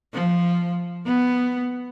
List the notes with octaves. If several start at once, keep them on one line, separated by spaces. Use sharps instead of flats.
F3
B3